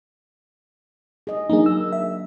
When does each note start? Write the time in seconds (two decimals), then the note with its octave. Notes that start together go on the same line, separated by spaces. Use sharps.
1.27 G#4 D#5
1.50 F#3 A#3 D4 D#4 G#4
1.66 E6
1.92 E5